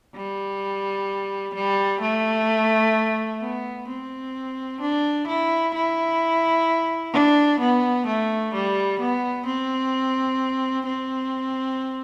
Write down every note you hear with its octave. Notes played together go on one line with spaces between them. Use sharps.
G3
G3
A3
B3
C4
D4
E4
E4
D4
B3
A3
G3
B3
C4
C4